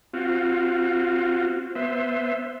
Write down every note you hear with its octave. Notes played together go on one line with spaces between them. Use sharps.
C4 F4 F#4
B3 C5 E5